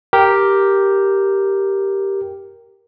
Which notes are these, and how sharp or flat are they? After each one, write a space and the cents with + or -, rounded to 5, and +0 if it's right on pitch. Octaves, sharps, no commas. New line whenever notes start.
G4 +0 A#4 +0